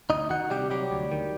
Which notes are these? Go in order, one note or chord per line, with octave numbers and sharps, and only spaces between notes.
D2 D#4 D#5
D#3 F#4 F#5
C3 G3 G4
F#3 G3 G4
D2
D#3